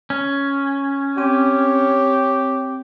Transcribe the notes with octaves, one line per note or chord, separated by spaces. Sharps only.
C#4
C4 G4 C#5